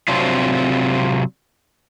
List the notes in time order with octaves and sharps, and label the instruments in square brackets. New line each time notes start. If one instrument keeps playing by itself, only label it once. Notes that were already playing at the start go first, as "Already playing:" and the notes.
[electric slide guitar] C3 F#3 C4 D4 F4